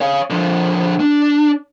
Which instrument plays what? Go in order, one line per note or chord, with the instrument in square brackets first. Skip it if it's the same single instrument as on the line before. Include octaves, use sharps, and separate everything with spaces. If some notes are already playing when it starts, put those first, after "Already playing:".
[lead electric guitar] C#5 F5
D3 F3
D4